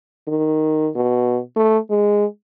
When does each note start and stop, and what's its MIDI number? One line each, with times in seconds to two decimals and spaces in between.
0.28 0.89 51
0.95 1.40 47
1.56 1.78 57
1.90 2.25 56